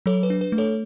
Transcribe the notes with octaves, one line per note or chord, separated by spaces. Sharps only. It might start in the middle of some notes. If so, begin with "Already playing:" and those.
F#3 A4 C#5
B4
D4
B4
A3
A4 C#5